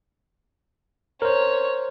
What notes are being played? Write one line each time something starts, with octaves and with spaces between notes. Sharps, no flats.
A#4 C5 C#5